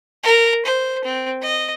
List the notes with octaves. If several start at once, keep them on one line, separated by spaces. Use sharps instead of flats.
A#4
C5
C4
D#5